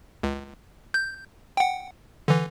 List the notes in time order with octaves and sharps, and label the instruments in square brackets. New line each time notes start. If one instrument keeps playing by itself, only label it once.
[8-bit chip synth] C#2
G6
F#5 G5
D3 E3